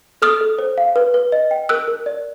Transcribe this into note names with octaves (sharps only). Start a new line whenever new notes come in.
A4 D#6 F6
A4
C5
F5
B4
B4
D#5
G5
A#4 E6 F#6
A#4
D5